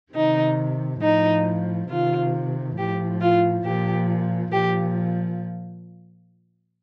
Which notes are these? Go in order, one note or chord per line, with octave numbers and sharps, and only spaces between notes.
C3 D#3 D#4
A2 F3 D#4
C3 D#3 F4
A2 F3 G4
F4
A#2 F3 G4
A#2 F3 G4